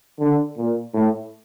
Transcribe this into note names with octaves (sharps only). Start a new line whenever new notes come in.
D3
A#2
A2